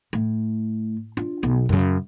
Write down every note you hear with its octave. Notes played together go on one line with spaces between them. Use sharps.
A2
D4 F4
B1 B3
F#2 C#3